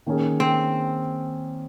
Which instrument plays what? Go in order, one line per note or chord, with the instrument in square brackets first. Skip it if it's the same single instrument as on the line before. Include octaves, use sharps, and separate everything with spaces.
[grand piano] D#3 A#3 C#4 G#4
[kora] C4